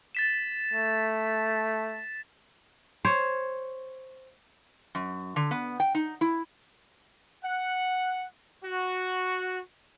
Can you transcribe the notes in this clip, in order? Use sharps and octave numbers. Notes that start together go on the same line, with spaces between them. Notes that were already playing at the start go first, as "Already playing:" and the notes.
A6 B6 E7
A3
C5 C#5
F#2
D3
B3
G5
D#4
E4
F#5
F#4